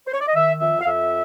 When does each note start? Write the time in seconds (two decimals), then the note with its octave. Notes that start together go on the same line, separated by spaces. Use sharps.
0.07 C5
0.14 C#5
0.21 D5
0.28 D#5
0.35 D#3 E5
0.61 F2 E5
0.81 F5
0.87 F2 E5